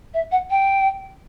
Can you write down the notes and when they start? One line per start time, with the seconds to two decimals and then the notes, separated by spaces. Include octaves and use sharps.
0.14 E5
0.32 F#5
0.50 G5